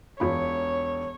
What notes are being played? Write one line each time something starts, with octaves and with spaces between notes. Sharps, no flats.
E1 F4 C#5 B5